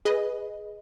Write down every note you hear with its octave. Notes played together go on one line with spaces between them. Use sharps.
G#4 B4 D#5